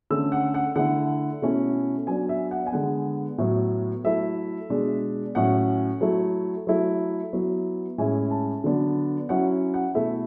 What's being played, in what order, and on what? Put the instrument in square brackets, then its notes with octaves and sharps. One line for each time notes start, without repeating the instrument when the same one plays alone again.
[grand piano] D3 A3 C#4 E6
F#5
F#5
D3 A3 E4 F#5
B2 A3 C#4 E4
F#3 B3 D4 G#5
E5
F#5
G#5
D3 G#3 B3 F#5
A2 F#3 B3
F#3 A3 E4 E5
B2 G#3 D4
A2 F#3 C#4 F#5
F#3 A3 E4
F#3 A3 E4
F#3 B3 E4
A2 G#3 C#4 E4 G#5
A5
D3 F#3 B3 D4
F#3 C#4 E4 F#5
F#5
B2 A3 E4 E5